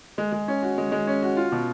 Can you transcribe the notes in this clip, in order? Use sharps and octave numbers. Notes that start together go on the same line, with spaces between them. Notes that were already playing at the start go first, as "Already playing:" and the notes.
G#3
G#3
C#4
F#4
G#3
G#3
C#4
F#4
F4
B2